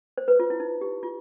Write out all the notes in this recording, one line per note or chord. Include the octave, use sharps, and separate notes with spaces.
C5
B4
F4
E4
D#4
G4
F4